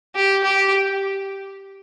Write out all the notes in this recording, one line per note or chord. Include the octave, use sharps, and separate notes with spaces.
G4
G4